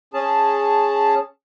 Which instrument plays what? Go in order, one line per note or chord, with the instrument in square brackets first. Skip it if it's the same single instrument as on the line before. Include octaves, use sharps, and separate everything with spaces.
[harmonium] C#4 G#4 A5